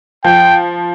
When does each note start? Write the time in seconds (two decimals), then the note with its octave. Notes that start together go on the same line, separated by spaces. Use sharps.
0.24 F3 G5